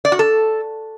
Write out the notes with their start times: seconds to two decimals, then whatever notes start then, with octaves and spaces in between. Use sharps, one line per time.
0.05 D5
0.12 F#4
0.19 A4